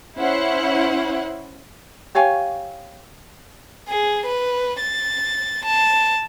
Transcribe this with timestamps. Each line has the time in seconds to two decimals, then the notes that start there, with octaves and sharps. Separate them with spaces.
0.18 C#4 E4 C5 F#5
2.15 G4 C#5 F5 G#5
3.89 G#4
4.26 B4
4.81 A6
5.65 A5